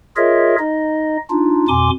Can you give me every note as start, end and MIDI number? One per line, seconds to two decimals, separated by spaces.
0.17 0.56 65
0.17 0.56 68
0.17 0.56 70
0.17 0.56 73
0.17 0.56 75
0.17 0.56 76
0.59 1.17 63
0.59 1.17 75
1.30 1.67 62
1.30 1.67 63
1.30 1.67 65
1.68 1.90 41
1.68 1.90 47
1.68 1.90 80
1.68 1.90 84
1.68 1.90 86